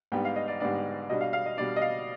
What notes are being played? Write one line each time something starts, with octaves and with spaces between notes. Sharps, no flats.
G#2 G3 B3 D4 G5
F5
D#5
D5
G#2 G3 B3 D4 D5
B2 G3 D4 D#5
F5
F5
D#5
B2 G3 D4 D5
D#5
F5